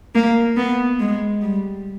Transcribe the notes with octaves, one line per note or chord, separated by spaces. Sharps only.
A#3
B3
G#3
G3